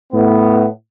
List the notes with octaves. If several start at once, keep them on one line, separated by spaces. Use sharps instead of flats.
A2 B3